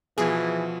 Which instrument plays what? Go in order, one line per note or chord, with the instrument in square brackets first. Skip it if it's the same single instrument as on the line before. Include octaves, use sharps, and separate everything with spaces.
[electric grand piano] B2 F3 [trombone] E3 [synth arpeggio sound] G#4